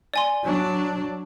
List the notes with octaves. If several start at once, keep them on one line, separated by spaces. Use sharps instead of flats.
D5 G#5 C6
F#3 D4